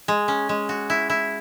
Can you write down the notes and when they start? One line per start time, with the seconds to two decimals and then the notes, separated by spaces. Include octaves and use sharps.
0.08 G#3
0.28 C#4
0.49 G#3
0.69 F#4
0.90 E4
1.10 E4